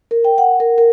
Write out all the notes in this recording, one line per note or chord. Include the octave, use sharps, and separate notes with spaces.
A#4
G5
F#5
A#4
A#4